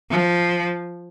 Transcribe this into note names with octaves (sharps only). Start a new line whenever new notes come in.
F3